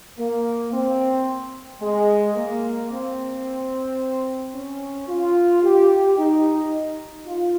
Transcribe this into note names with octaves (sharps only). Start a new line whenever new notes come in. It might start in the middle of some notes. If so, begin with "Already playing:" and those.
A#3
C4
G#3
A#3
C4
C#4
F4
G4
D#4
F4